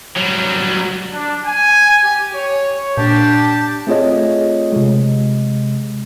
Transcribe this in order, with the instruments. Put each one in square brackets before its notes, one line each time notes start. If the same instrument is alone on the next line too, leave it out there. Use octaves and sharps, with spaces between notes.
[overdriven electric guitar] F#3 G3
[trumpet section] D4
G#5
G4
C#5
[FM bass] A#2 [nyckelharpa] D4 [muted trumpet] G4 [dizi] A5
[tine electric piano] A3 C4 F4 G#4 C#5 D#5
C3 G#3